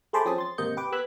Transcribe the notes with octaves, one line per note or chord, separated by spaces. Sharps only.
A3 G#4 C5 A5 B5 D6
F3 C4 C#4 G#4 A5 D#6
C6 A6
G#1 C3 A#3 D#5 G6 C#7
G4 B4 D6
B3 E6 F#6 G#6 B6